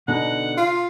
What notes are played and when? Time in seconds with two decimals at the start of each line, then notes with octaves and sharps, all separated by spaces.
0.08 B2 D3 D#4 F#5
0.57 F4